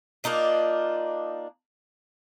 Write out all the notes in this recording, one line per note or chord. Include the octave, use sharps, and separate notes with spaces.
A#3 D4 D#4 F4